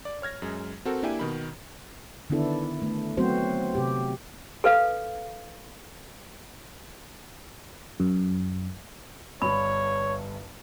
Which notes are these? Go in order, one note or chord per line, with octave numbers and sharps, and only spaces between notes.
D5
C#5 F6 G#6 A#6
F#2 G#3
C4 F#4 A4 A#4
A#3 D4 E4 G4 G5 G#5
B2 D#3 B5
D3 D#3 B3 D4 E4 A4
A3
F#3 A3 B3 C4 F#4 C5
C3 G4
A4 B4 F5
F#2
G1 G2 C#5 B5